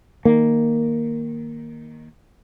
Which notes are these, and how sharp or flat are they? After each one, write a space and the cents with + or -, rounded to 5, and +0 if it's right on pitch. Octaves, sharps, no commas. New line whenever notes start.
D#3 +0 A#3 +0